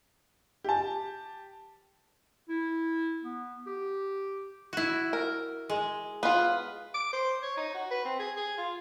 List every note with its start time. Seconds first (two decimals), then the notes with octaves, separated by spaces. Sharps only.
0.64 G4 A5
2.49 E4
3.24 B3
3.67 G4
4.73 E4 F#4
5.13 A#4
5.70 G#3
6.23 B3 F4 B4
6.94 D6
7.13 C5
7.43 C#5
7.57 D#4
7.74 F#4
7.91 B4
8.05 C4
8.20 G#4
8.37 G#4
8.58 F4